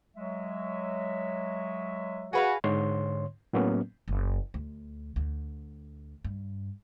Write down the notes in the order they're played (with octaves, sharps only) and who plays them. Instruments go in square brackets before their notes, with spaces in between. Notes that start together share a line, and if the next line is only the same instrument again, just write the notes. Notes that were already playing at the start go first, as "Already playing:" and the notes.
[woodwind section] F#3 G#3 E5
[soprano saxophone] F#4 [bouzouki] G#4 B4 F5
[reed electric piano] G#2 D3 C#5 C6
A2 F#3 A#3 B3 C#4
[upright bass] F#1
D2
D2
G2